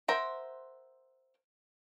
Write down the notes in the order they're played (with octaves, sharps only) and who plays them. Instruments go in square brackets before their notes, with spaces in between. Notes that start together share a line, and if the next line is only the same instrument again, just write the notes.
[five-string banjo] A#4 C5 E5 F#5